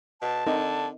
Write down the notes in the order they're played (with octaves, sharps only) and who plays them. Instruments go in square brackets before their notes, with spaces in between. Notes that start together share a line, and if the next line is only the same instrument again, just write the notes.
[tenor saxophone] B2 [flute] A5
[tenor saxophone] D3 [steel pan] C4 D#4 A#4